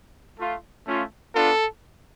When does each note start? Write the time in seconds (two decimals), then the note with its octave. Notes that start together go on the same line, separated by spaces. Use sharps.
0.37 A3 F4
0.86 A3 C#4 F4
1.33 B3 D4 F4 A4